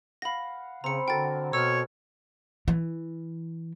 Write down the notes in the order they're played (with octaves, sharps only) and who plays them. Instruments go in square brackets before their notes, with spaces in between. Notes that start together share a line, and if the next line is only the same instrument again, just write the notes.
[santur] F5 F#5 [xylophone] B5 A#6
[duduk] C#3 [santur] C4 B5 [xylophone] A#5 C#7
[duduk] D3 [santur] F#4 A4 A#4 [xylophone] G5 A6
[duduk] B2 [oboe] C#5 [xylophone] E6 F6
[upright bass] E3